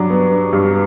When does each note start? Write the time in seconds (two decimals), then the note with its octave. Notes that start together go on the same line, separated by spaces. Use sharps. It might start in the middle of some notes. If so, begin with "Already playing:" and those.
Already playing: G2 F#3 D4
0.10 B3
0.32 D4
0.53 G2